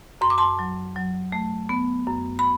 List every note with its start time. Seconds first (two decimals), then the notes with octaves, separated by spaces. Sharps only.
0.21 F#2 C6
0.30 D6
0.38 A5 C6
0.59 F#3
0.96 F#3
1.32 A3
1.69 B3
2.07 F#2
2.39 B5